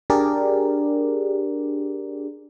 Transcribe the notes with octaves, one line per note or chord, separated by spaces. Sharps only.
D4 G4 G#4 A#4 D5